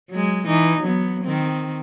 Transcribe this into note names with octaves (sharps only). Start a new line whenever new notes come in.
F#3 G#3
E3 D#4
F#3 B3
D#3 C4